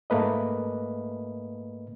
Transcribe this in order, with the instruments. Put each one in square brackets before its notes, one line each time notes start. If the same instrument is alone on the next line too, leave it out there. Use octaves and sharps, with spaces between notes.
[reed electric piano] G#2 A3 A#3 B4 D#5